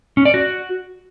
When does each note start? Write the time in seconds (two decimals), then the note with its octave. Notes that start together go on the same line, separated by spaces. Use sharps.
0.17 C#4
0.25 D5
0.34 F#4